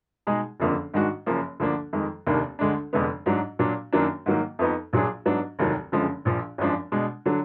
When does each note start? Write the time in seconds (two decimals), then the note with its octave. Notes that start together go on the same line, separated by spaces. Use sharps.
0.27 B2 G#3 D#4 G#4
0.60 F#1 F2 D3 F3 A#3
0.94 G#2 D#3 G#3 D4 F#4
1.26 F#1 F#2 F3 A#3
1.60 D2 D3 F3 A#3 D4
1.93 F2 D#3 G#3
2.27 F1 D#2 D#3 A#3 D4
2.59 D2 D3 G#3 D4
2.93 F1 F2 D3 G#3 B3
3.26 G#2 F#3 D4
3.59 A#2 F#3 D4
3.93 F#2 D#3 F#3 A#3 D4
4.26 G#2 D#3 F#3 A#3
4.59 F2 F3 B3 D#4
4.93 A#1 A#2 F#3 D4 G#4
5.26 G#2 F#3 B3 D4
5.59 F1 D#2 D#3 F#3
5.92 F#1 F#2 D3 F3 G#3
6.25 A#1 A#2 F3
6.58 G#1 F#2 F3 G#3 D4
6.92 B2 G#3 D4
7.26 D3 F#3 D4